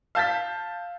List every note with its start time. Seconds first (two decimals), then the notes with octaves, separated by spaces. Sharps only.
0.15 F5 A5 G6 A6 B6